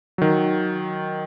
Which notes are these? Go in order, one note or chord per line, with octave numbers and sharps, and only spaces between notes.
D#3 F#3